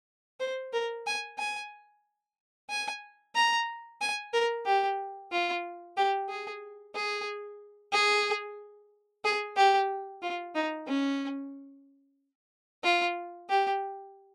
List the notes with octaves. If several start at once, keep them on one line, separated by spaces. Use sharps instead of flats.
C5
A#4
G#5
G#5
G#5
A#5
G#5
A#4
G4
F4
G4
G#4
G#4
G#4
G#4
G4
F4
D#4
C#4
F4
G4